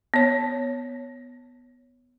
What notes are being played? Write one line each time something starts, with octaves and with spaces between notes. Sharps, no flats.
B3 C#5